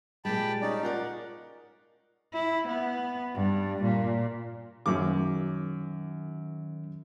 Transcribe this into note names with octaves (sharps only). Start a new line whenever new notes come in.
A#2 G3 G#3 G5 A5 B5
C#4 D#4 D5
F4 A#4 D5 F#5
E4
B3
G2
A#2
F#2 D#3 F#3 C#4 D6